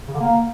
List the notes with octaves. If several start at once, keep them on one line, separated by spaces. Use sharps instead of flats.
C#3
D3
A#3